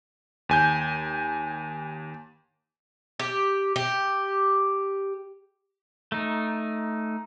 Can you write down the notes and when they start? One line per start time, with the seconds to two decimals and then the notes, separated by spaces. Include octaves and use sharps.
0.49 D#2 G#5 G6
3.20 G4
3.76 G4
6.12 A3 D#4